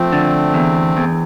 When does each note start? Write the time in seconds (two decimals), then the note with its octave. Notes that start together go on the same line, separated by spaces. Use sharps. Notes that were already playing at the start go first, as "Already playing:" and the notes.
Already playing: F3 A3 C4
0.12 D3
0.54 E2
0.97 E2